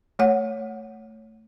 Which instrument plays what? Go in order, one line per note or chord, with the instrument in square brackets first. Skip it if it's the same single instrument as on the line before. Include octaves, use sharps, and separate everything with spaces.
[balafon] A3 C#5 F#5